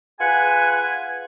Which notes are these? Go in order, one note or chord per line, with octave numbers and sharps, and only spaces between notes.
F4 G#4 B4 F#5 G#5